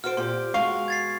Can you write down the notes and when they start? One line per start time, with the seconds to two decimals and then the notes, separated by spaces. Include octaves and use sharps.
0.04 F#4 A4 C5 F6 D7
0.17 A#2 C4 G4 C6
0.54 B2 G#3 F#4 F5 C#6
0.88 G#6 A6 C7